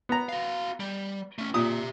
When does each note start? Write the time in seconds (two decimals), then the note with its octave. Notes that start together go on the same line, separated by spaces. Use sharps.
0.09 B3 A#5
0.29 F#4 F5
0.80 G3
1.38 A3 C#4
1.54 A#2 G4 E5 D#6